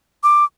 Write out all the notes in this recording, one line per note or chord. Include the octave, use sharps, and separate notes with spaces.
D6